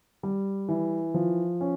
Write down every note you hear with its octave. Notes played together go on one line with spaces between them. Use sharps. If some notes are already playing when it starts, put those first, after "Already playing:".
G3
E3
F3
C#4